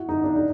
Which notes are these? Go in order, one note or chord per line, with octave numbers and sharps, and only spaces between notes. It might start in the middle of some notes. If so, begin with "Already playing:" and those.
Already playing: E4 F#4
D#4
D4
D#4